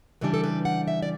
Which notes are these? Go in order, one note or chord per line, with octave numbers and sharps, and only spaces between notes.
C#3 E3 G3 D4 B4
A4
B4
F#5
E5
D5